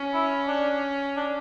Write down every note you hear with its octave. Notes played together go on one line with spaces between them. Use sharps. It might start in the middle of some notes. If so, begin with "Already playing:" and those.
Already playing: C#4
E4
D4
D4